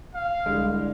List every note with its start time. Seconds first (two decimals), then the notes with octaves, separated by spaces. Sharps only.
0.15 F5
0.46 C2 D3 G#3